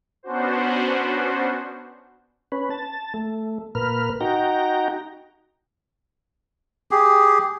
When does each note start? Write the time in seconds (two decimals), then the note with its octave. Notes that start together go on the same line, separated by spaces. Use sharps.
0.23 B3 C#4 D4 F#4 C5
2.52 C#4 B4
2.70 A5
3.14 A3
3.75 A#2 A#4 B4 F6
4.21 D#4 F#4 G5 A#5
6.91 G4 G#4